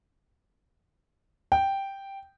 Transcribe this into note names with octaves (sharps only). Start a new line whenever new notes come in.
G5